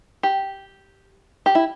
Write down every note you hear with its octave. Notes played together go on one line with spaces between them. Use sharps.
G4
G4
E4